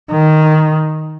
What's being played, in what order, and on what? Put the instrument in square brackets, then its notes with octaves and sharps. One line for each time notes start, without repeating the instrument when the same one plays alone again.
[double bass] D#3